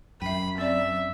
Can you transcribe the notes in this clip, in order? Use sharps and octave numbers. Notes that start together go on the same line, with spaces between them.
F#2 E5 G5 B5
C4 D5 E5